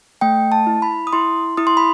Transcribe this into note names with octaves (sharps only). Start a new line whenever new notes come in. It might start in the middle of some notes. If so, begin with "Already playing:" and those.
A3 G5
A5
E4
B5
D#6
E4 C6
E4 D#6
C6
B5